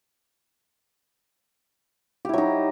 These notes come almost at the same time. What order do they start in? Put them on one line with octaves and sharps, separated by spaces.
G4 E4 F#3 D#4